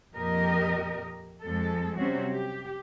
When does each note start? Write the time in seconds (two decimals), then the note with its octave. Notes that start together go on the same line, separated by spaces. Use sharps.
0.15 F2 A#2 G4 A#4 D#5
1.43 F2 G#3 A4
1.97 C3 F#3 G3 C4 C#4 F#4
2.31 G4